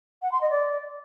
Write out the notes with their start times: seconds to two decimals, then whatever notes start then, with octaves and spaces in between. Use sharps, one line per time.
0.22 F#5
0.31 C6
0.41 D#5
0.50 D5